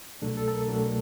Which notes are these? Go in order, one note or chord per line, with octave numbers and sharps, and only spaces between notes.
C2 B2 F#3 A3 D4 A4
A4
A4
A#4
C2 B2 F#3 A3 D4